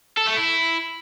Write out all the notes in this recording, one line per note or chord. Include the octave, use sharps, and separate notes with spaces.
A4
A3
E4